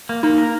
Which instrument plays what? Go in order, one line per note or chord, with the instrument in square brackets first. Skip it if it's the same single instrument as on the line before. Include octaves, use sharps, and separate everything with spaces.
[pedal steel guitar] A#3
[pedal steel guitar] A#3 [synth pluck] D#4
[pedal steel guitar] A#4